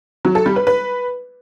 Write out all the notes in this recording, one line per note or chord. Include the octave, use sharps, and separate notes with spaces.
F#3
A4
G3
B4
B4